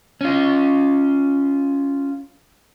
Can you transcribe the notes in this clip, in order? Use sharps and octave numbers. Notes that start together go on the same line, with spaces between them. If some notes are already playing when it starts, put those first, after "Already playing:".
C#4 F4